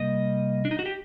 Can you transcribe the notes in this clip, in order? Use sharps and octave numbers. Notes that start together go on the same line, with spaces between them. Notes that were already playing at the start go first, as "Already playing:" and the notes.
Already playing: C3 G3 A#3 D#5
D4
D#4
F#4
G4